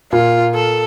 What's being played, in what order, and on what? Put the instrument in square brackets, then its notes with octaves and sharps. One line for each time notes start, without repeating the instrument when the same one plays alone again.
[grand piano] A#2 [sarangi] F4
[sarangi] A4